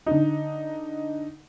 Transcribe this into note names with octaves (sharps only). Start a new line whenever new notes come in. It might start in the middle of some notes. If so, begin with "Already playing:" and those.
D3 D#4